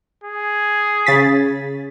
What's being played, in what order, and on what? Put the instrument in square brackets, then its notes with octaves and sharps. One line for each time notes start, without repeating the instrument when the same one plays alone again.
[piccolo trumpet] G#4
[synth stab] C#3 A6 B6